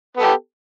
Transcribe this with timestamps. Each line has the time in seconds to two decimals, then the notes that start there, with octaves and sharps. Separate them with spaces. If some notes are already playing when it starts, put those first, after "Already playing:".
0.17 B3
0.20 A4
0.22 G4